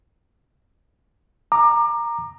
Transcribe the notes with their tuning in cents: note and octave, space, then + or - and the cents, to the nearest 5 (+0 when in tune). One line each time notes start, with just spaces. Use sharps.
A#5 +0 D6 +25